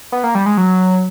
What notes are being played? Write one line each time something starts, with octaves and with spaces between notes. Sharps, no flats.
B3
A#3
G3
G#3
F#3